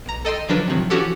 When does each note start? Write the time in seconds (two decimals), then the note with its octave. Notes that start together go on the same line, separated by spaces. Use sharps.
0.06 B1 A#5
0.25 A4 D#5 G5 C6
0.48 D3 F3 F#3 D4 A#4 B4
0.67 A2 C3 D#3 F3 F#3
0.90 E3 F3 C#4 F#4 G4 A4